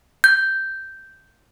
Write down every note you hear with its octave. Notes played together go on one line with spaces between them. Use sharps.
G6